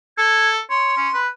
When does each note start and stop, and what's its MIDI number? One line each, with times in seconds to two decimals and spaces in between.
0.18 0.60 69
0.18 0.49 92
0.70 0.95 73
0.70 1.20 84
0.97 1.09 61
1.14 1.27 71